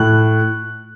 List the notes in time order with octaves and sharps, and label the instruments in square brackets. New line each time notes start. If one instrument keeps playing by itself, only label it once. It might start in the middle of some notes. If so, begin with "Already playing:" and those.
Already playing: [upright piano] A2 F#6